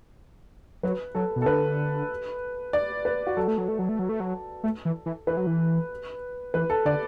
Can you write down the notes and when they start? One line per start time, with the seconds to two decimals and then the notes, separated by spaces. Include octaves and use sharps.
0.83 F#3 B4
1.15 F#3 A4
1.36 B2
1.42 A4
1.46 D3 B4
2.73 D5
3.05 B4
3.27 F#4
3.37 F#3 A4
3.48 A3
3.58 F#3
3.68 A3
3.79 F#3
3.89 A3
3.99 F#3
4.09 A3
4.20 F#3
4.64 A3
4.85 E3
5.06 E3
5.27 E3 B4
5.37 F#3
5.47 E3
6.54 E3 B4
6.70 A4
6.85 D3 D5